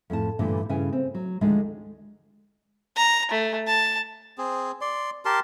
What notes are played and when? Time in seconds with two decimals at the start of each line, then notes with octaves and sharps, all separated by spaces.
0.10 F2 A2 A5
0.39 G2 A#2 D3 E3 G3 A3
0.69 G2 C#3 E4 B4 G5 G#5
0.93 C4
1.15 F#3
1.41 D2 D#3 F3 G#3 A3 D4
2.96 A#5
3.31 A3
3.67 A5
4.38 C4 G#4
4.81 D5 C6
5.25 G4 A#4 A5 C6